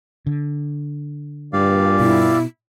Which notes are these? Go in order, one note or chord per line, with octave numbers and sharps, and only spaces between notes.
D3
G2 A#2 G4 D5 F5
B2 E4